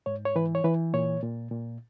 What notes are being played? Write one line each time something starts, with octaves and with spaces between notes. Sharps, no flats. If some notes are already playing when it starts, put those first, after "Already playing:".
G#2 C#5
C#5
E3 B4
C#5
E3 B4
A#2 C#5
A#2
A#2